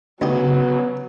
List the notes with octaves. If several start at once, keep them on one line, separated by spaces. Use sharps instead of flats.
D2 C#3 F#3 B3 D#4 G4